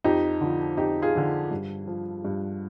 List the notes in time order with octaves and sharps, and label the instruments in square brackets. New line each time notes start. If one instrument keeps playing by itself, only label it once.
[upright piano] F2 D#4 G4
D3 F3
F2 D#4 G4
F4 G#4
D3 F3
G2
F3
G2